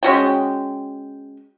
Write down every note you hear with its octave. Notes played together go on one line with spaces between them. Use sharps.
G#3 C#4 F#4 G5